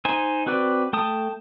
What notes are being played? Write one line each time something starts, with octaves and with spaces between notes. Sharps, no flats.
D#4 C5 G#5
C4 F#4 B4 D5
A3 G5 A5 D#6